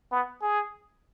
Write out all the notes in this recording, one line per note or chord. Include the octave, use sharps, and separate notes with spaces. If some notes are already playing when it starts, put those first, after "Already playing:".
B3
G#4